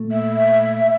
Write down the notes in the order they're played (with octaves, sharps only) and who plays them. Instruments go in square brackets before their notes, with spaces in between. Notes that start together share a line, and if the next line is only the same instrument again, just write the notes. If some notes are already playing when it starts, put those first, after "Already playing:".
Already playing: [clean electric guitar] A#2 A3
[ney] E5